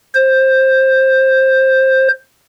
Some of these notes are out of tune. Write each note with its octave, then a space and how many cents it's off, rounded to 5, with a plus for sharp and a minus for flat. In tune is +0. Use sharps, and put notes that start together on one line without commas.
C5 +15